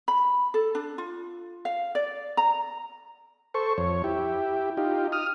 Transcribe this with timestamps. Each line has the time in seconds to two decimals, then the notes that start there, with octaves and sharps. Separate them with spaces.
0.08 B5
0.54 A4
0.75 D4
0.98 F4
1.65 F5
1.95 D5
2.37 A#5
3.54 A4 C5 C#6
3.78 F2 C#5
4.04 E4 G4
4.77 D#4 F4 G4
5.12 D#6 F6